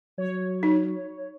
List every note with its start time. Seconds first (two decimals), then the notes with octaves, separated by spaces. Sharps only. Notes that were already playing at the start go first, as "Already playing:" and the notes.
0.18 F#3 C#5
0.63 D#4